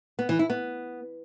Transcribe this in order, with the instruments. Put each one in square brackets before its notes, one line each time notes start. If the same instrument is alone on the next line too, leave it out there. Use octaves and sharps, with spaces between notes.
[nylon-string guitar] B3
E3
E4
B3